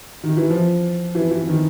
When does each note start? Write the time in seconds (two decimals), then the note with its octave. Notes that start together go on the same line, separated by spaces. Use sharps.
0.23 D#3
0.37 E3
0.50 F3
1.15 E3
1.31 E3
1.47 D#3